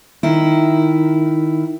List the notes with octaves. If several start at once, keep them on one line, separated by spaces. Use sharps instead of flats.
D#3 E4